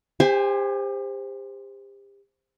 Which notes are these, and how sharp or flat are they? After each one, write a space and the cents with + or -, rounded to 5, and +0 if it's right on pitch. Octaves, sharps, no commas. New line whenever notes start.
G4 +35 C5 +0 G#5 -5